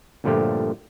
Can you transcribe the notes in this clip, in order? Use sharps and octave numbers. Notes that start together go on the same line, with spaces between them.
G1 A#2 D3 F3 A3 G4